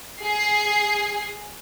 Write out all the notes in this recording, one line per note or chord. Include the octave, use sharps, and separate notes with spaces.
G#4 C7